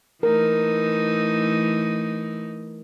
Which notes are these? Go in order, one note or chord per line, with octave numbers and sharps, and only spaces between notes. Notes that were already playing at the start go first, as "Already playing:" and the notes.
E3 A3 D#4 A#4